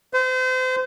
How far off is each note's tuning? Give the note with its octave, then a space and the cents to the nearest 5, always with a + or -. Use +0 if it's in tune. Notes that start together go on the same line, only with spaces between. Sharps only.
C5 -35